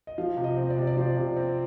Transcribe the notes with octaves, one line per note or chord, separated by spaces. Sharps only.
D#5
F3 F5
C3
D#5
C4
D5
C3
D5
F3 C5
C3
C4